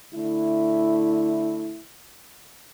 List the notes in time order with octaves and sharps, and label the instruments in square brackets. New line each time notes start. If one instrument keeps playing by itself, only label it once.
[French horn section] D3 A3 E4